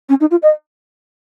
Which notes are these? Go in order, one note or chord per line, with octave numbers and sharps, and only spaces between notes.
C#4
D#4
F4
D#5